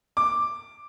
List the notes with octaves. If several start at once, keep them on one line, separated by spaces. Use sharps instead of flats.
D6